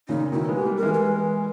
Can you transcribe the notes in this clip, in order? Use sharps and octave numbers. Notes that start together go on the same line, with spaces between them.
A#2 C#3 D#4
B2 D#3 E4
G#3 B3
G4
G3 A#3
A#4
E3 G#3
A#4
B4